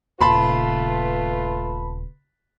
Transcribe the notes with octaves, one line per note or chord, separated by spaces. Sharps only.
D#1 C#3 A3 F4 B4 A5 B5 C6